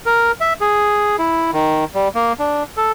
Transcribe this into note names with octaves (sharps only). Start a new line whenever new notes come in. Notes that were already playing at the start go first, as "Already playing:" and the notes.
A#4
E5
G#4
E4
D#3
G3
A#3
D4
A4